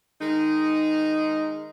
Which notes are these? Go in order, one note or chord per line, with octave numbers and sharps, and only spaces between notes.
D#3 G#3 D#4